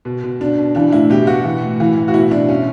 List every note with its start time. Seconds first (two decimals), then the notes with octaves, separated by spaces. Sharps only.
0.05 B2
0.23 B2
0.40 B2 D4
0.59 B2
0.75 E3 D4
0.92 A2 E4
1.10 B2 G4
1.27 B2 F#4
1.44 E3
1.63 A2
1.80 E3
1.97 A2
2.08 F#4
2.14 B2 E4
2.31 B2 D4
2.49 B2 C#4